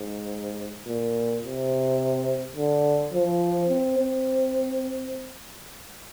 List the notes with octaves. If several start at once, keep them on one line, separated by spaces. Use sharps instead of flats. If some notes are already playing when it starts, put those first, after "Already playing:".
Already playing: G#2
A#2
C3
D3
F3
C4
C4